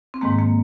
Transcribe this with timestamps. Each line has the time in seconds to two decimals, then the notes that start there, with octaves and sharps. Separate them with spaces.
0.14 C4
0.21 G#2 D#3 G#3 A#3
0.39 A#3